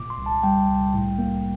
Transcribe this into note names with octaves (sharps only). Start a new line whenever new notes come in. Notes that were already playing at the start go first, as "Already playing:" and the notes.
Already playing: A#2 D6
C6
C2
A5
G3 G5
C2
A2
A#3